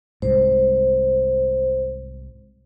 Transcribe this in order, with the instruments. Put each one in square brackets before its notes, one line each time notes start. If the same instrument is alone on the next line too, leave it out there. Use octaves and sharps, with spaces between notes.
[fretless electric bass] C2 G#2 [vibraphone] C5